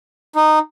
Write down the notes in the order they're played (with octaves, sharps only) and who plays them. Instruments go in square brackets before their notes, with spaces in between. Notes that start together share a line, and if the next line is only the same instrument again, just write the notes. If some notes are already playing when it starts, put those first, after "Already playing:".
[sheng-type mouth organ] D#4